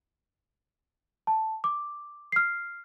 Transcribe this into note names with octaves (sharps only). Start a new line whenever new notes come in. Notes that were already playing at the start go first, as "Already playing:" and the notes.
A5
D6
F6 C7